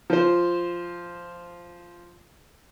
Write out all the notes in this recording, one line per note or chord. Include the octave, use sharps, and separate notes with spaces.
F3 C5